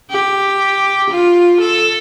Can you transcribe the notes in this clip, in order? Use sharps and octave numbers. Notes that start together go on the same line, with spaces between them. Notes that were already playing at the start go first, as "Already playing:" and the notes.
G4
F4
A4